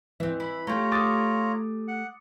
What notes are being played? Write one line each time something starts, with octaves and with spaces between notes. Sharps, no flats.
E3 C4 E5
E4 B5
A3 F4 G4 C#5 A#5
D6 D#6 A6
F#5